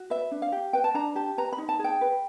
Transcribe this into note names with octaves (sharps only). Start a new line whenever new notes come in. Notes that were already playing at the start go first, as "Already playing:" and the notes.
Already playing: F#4
B4 E5
D4
F5
G4
B4 G5
A5
D4 A#5
G4 A5
B4 A#5
B5
D#4
A5
G#4
G5
B4